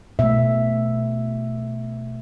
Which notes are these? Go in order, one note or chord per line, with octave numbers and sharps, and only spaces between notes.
B2 A3 E5